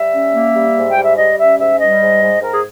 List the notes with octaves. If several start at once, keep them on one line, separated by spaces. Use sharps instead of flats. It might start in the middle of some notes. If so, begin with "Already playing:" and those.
Already playing: G3 E5
C#4
A#3
G3
G#2
G5
G3
E5
G3 D#5
C#4 E5
G#2 E5
G3 D#5
G#2
G#2
G#2 A#4
G#4